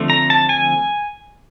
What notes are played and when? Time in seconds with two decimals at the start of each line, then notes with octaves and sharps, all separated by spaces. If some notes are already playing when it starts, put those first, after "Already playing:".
Already playing: D3 F3 A3 C4
0.10 A#5
0.30 A5
0.49 G#5